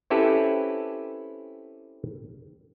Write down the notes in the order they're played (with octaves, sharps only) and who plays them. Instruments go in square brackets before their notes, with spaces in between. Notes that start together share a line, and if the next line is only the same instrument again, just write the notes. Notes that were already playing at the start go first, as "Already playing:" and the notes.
[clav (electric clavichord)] C4 C#4 E4 G4 A4 B4